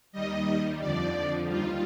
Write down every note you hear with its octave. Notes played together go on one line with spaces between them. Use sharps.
D#2 D#3 G3 D#5
F2 D3 F3 D5
D#2 D#3 G3 F4